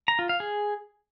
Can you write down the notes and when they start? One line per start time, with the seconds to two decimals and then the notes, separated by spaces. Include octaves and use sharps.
0.08 A#5
0.19 F4
0.29 F5
0.40 G#4